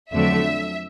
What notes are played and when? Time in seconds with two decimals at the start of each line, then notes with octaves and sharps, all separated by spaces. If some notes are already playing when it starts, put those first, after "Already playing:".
0.12 F2 D3 F#3 A3 D4 E5